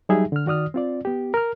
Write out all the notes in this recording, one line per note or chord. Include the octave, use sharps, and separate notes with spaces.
F#3 G3 D#4 G4 G#4 E5
D3 F6
D#3 F#4 D5 D#6 F6
C4 F4 D5
B3 G4
A#4 F6